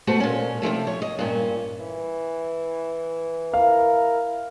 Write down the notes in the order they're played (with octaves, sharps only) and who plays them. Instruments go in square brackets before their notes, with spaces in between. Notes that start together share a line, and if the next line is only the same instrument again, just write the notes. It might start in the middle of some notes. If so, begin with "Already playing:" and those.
[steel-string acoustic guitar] B2 A3 F#4 B4 C5
A#2 C#4
C3 E3 F3 A3
C#5
D#5
G2 A#2 C#4
[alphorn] E3
[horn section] E4 A#4 [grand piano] F5